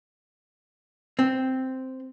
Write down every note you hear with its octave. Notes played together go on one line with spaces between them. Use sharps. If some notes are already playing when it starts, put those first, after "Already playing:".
C4